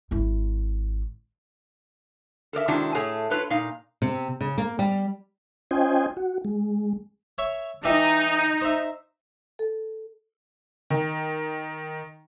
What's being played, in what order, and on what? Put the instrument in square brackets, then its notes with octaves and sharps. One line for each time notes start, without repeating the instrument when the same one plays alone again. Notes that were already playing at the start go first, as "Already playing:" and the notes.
[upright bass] G#1 E4
[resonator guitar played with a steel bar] A4 A#4 D5 E5
C3 D#3 G#3 D4 E4 F#4
A2 A3 G#4 C#5
F4 A4 B4 C#5
A#2 D#4 F5
[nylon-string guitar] C3
C#3
A#3
G3
[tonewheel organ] C#4 F4 C5 D#5 G5 G#5
F#4
G#3
[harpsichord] C#5 E5 C#6
[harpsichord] E3 G4 E5 [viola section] D#4
[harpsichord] C5 E5
[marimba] A4
[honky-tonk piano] D#3